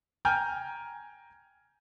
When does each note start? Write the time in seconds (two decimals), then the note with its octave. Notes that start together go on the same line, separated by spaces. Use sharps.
0.25 G5 G#5 A#5 F6 G6